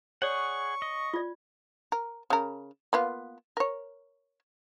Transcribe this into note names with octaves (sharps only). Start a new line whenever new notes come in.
G#4 C#5 D5 F#5 C#6
D#5
F4 D5
A#4
C#3 A#4
A#3 B3 F4
A#4 C#5